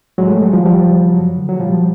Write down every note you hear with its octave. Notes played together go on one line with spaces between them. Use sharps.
A2 F#3 G#3
G3 A3
F3 F#3 G#3
F3 G3
E2 F3 G3
C#3 E3
F#2 F#3
D3 F3
F#3
A#2 F3 G3